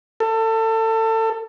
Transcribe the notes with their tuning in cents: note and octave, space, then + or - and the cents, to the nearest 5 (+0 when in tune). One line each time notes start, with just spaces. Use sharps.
A4 +30